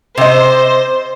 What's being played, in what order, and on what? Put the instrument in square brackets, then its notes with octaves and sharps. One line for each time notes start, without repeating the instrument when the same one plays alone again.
[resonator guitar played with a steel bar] C3 D#5 [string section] C5